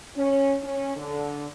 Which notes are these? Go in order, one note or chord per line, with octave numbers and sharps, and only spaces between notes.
C#4
C#4
D3